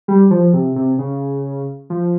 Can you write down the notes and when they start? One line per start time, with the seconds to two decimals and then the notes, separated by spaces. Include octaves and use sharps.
0.08 G3
0.31 F3
0.53 C3
0.76 C3
0.98 C#3
1.90 F3